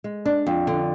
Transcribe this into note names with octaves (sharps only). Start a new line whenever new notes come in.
G#3
D4
F2
D3